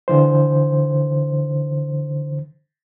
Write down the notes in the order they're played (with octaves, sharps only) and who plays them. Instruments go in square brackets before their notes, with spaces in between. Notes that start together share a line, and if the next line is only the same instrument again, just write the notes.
[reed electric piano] D3 E3 C5